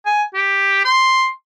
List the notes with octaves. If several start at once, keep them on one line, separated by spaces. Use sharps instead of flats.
G#5
G4
C6